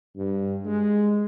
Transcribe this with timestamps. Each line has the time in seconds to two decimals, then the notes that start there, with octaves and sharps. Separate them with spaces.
0.16 G2
0.65 G#3